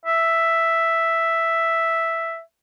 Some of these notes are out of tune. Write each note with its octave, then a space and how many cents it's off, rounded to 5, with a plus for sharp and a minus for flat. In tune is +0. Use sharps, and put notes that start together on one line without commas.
E5 +0